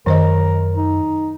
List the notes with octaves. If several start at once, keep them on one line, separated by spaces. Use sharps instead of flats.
F#2 D#3 A#4 C5 D#5
D#4